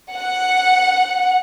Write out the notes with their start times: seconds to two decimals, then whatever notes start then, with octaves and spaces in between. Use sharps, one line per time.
0.12 F#5